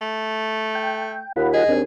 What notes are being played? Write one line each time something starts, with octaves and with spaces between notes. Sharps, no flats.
A3
G5
D#2 F4 F#5 B5
G#4 D#5
D#2 C4 D4